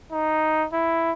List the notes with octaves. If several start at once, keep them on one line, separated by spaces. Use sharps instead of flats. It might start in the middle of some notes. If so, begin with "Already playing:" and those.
D#4
E4